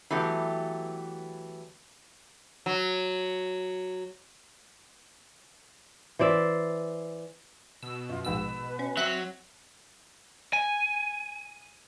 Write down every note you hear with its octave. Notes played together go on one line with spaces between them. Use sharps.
E3 F#3 A3 B3 G4
F#3
E3 C5 D5 E5
B2 E6
F#2 F4
A#1 G#2 B4 E6
C#4
F#3 C4 E5 F#6 B6
G#5